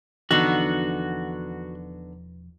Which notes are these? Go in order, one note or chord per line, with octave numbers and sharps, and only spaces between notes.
E1 D3 E3 F3 B3 D#4 F#4